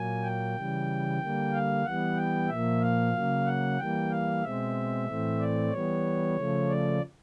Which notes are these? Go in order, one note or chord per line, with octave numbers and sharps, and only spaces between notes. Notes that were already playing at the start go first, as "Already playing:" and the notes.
Already playing: A#2 F#3 A#3 G#5
G5
C#3 E3 G3
D3 G3 A#3
F5
E3 G3 B3 F#5
G5
A#2 F3 A#3 E5
F5
C#3 F#3 A#3
F#5
E3 G3 A#3 G5
F5
B2 G#3 C4 E5
A2 E3 A3 C4
D5
E3 G3 B3 C#5
C#3 F3 A3
D5